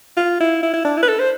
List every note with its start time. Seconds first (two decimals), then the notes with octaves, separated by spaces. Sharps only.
0.17 F4
0.40 E4
0.63 E4
0.73 E4
0.84 D4
0.97 E4
1.02 B4
1.08 A4
1.19 C5